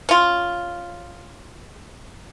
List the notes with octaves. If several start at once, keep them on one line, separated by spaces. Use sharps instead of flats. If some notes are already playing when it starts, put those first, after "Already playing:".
C#4 F4